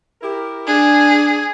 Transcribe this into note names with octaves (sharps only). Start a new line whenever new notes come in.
E4 G4 A#4
D4 G#4